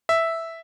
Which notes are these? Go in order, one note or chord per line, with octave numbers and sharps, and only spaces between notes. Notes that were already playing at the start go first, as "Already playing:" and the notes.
E5